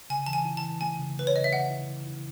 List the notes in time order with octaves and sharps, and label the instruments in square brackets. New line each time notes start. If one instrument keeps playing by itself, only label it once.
[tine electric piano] C#3 [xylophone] G#5
[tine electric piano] E3 [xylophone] A5
[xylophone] G#5
[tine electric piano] E4
[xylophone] A5
[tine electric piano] E3
[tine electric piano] A3 [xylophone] G#5
[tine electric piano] C#3
[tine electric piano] A3 [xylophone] B4
[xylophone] C#5
[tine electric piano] C#3 [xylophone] D#5
[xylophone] E5
[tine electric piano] E3 [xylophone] F#5
[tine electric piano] E4
E4
E4